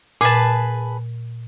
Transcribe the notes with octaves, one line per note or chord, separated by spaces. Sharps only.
A#2 G#4 B4 A5